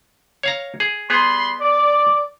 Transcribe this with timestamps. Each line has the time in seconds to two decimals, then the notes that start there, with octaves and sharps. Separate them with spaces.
0.43 C#5 F5 A#5
0.80 G#4
1.10 G3 B3 G#4 B5 C6
1.61 D5